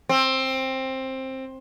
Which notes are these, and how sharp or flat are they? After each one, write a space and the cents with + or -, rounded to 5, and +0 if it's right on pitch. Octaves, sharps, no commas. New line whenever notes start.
C4 +15